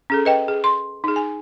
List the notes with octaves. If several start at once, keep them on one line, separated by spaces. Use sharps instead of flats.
C#4 G#4 A4
B4 D#5 G5
G#4
C6
D#4 G#4
G#5